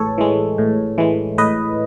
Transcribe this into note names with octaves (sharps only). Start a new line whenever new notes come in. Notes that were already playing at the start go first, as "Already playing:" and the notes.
Already playing: A2 E3 G#3 A4 B4 C#5
E3 G#3
A2
E3 G#3
A2 B4 D#5